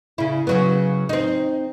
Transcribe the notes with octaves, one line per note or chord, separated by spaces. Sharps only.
C#3 E4
C#3 F#3 B3
C4 D#4